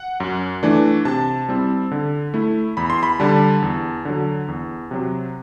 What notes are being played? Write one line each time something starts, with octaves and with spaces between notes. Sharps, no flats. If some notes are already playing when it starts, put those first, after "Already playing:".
Already playing: F#5
F#2
E3 A3 D4
C3 A5
G3 C4 E4
D3
A3 E4
E2 B5
C6
B5
D3 G3 A5
E2
D3 F#3
E2
C3 F#3